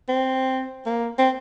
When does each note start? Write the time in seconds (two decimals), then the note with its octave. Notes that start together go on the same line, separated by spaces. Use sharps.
0.09 C4
0.86 A#3
1.19 C4